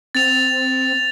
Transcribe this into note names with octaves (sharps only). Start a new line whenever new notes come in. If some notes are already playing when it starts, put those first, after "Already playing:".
C4 A6 F7